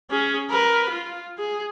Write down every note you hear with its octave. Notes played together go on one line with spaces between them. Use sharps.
C#4 G#4
A#4 B4
F4
G#4